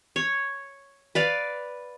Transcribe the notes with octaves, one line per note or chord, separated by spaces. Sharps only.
C#5
B4 D5 F5